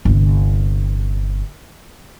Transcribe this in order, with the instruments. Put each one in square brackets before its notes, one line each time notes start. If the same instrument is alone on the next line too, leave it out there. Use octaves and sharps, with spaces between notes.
[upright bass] G1 C3